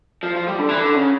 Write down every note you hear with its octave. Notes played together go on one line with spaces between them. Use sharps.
F3
F3
G3
D3
E3
D3
C#3